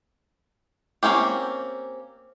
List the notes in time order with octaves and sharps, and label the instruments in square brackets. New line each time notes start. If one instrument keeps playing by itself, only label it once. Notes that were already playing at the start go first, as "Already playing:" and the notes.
[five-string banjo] A#3 C4 C#4 G4